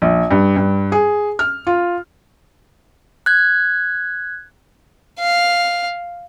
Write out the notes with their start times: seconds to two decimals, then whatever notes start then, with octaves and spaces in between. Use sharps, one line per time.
0.02 A#1
0.31 G2
0.56 G2
0.92 G#4
1.39 F6
1.67 F4
3.26 F#6 G#6
5.19 F5